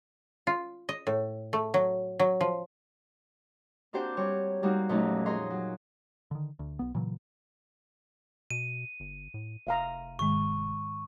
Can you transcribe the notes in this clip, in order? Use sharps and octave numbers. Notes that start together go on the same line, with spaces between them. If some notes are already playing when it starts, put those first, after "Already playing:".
F4
D#5
A2
A3
F#3
F#3
F3
A#3 C4 D4 F#4 G4 C5
G3 C4 C#5
G3 A#3 C4 D#4 F#4
F2 A#2 F#3 A3 C#4 D#4
G#4 A#4 C#5 D#5 C6
F#3
D3 D#3
D2
B1 B3
A#2 C#3 E3 F#3
B2 D#7
G1
A2
F1 E5 F5 A#5
G#2 D#3 G#3 C#6